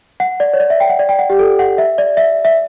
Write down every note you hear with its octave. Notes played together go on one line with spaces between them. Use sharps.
F#5
D5
C#5
D5
E5
G5
F#5
D5
G5
F#5
G4
A4
F#5
E5
D5
E5
E5